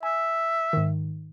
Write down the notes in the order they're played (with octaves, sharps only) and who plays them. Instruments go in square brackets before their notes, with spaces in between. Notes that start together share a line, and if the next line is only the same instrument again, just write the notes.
[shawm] E5 [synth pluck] G#5
[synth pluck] G#2 D#3